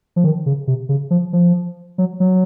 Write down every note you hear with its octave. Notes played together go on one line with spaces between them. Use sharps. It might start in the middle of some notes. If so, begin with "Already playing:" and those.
F3
D#3
C#3
C3
C#3
F3
F3
F#3
F#3